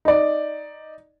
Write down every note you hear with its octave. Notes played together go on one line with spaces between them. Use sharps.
D#4 D5